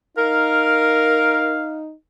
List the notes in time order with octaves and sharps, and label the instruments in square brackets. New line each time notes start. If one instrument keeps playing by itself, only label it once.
[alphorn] D#4 [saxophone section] A#4 [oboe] F5